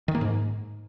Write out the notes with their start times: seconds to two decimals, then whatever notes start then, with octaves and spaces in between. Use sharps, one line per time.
0.08 D#3
0.15 A#3
0.21 G#2